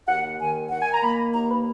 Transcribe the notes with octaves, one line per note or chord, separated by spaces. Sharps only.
D#2 F#5
D#3 G#5
D#3 F#5
G#5
A#5
A#3 B5
D#2 A#5
B5